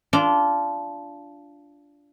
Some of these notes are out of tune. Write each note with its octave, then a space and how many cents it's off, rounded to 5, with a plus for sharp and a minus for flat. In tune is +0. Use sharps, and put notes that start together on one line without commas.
D4 -15 F4 -15